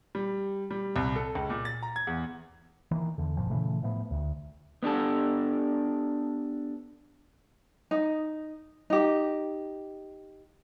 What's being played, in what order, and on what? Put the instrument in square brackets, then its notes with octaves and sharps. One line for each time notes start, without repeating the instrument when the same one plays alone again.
[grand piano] G3
G3
C2
A4
C#2
A#2
A6
A#5
G#6
E2
[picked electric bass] D#3 E3 A#3
E2 D3
G#1 F#2 A#2 F3
A#2 C#3 E3 A3
A2 F3 A3 B3
D2
[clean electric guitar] B3 D4 G4 A4
[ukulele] D#4
D#4 G4